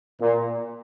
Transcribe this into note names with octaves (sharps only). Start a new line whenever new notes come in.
A#2